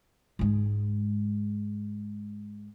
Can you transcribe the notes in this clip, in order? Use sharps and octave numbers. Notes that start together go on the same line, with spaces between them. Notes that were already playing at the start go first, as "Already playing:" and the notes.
G#2 G#3